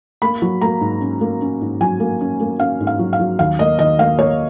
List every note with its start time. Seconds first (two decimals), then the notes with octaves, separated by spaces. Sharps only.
0.22 A#3 B5
0.42 F#3
0.61 A#3 A#5
0.81 G#2
1.01 C#4
1.21 A#3
1.42 C#4
1.61 G#2
1.81 F#3 G#5
2.00 A#3
2.21 C#4
2.40 A#3
2.60 C#4 F5
2.80 G#2
2.87 F5
2.99 F#3
3.13 F5
3.19 F#3
3.39 D#2 F5
3.59 A#3 D#5
3.79 D#2 D#5
3.99 A#3 F5
4.18 A#3 C#5